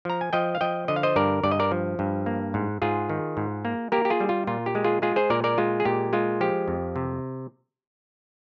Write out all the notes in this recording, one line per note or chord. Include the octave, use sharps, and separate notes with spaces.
F3 A#5
G#5
F3 D#5 G5
F5
F3 D#5 G5
D3 D#5
F5
C5 D#5
G2 A#4 D5
G2 D5
D#5
A#4 D5
F3
G2
A#3
G#2
G#2 F4 G#4
D#3
G#2
A#3
A#3 G4 A#4
G4
F4 G#4
G3
F4
A#2 F4
G4
G#3
F4 G#4
G#3 F4 G#4
G#4 C5
A#2 A#4 D5
A#4 D5
G#3 F4
G#4
A#2 G4
G#3 F4
F3 G4
F2
C3